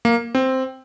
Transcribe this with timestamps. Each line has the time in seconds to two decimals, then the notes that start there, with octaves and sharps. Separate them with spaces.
0.05 A#3
0.35 C4